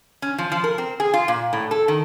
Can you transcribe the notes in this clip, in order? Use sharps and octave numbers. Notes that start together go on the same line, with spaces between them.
C#4
F3
F3
A#4
C4
G#4
F4
A#2
A2
A4
D#3